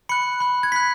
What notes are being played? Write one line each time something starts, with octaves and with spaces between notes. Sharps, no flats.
B5 F#6 C#7
B5 F#6
G#6
B5 F#6 B6